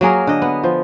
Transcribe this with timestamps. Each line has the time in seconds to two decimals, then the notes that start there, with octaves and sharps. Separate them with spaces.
0.01 F#3 A#3 G#4 A#4
0.27 D3 D#5
0.42 B3
0.63 F3